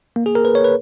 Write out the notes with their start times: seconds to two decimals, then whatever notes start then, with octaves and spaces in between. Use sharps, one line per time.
0.16 A#3
0.26 G#4
0.35 A#4
0.45 B4
0.55 C#5
0.64 B4